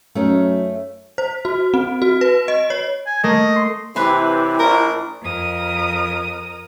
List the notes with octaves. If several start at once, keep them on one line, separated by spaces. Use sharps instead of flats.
F#2 A3 C#4 D#4
C5
F#4
C4
F#4
B4
D#5
C#5
G#5
A3 A#3 D#5
C6
C3 E3 E4 B4 C#5 C6
A#1 A#4
F2 A#4 D#6